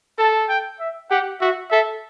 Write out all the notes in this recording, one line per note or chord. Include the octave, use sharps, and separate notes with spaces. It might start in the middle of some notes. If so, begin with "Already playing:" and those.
A4 A5
G5
E5
G4 F#5
F#4 E5
A4 E5